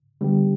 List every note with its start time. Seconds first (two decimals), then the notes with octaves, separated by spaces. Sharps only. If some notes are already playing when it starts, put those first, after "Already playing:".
0.21 D3 G3 B3 D4 G4